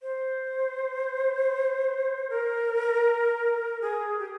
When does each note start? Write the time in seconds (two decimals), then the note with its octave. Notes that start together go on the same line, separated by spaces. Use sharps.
0.02 C5
2.30 A#4
3.81 G#4
4.19 G4